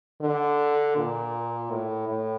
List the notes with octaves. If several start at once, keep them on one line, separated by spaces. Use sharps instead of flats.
D3
A#2
A2
A2